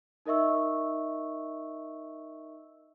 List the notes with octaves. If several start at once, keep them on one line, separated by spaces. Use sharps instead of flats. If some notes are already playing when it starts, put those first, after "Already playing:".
D#4 A#4 D#5 E5 C#6 E6